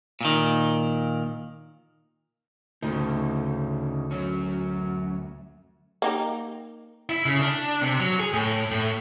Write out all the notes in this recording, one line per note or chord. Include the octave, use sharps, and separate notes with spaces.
A#2 D#3
D2 C#3 D#4
F#3 C#4
A#3 D#4 G4
E4
C#3
D4
C3
F#3
G#4
A2
A2